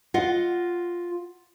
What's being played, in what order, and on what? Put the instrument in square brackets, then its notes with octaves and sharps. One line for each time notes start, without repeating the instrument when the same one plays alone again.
[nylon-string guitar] F4 D#5 F#5